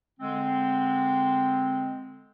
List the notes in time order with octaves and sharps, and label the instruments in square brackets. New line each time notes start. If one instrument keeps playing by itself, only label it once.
[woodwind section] D3 G#3 C4